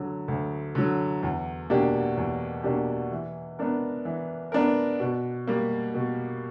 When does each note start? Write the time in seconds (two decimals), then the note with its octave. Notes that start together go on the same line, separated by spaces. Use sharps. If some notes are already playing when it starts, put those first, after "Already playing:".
Already playing: D2 D3 F#3
0.28 D2
0.75 D3 F#3
1.23 E2
1.70 B2 A#3 D4 G4
2.17 E2
2.63 B2 A#3 D4 G4
3.12 E3
3.59 B3 D4 A#4
4.05 E3
4.52 B3 D4 A#4
5.00 B2
5.47 G3 A#3
5.94 B2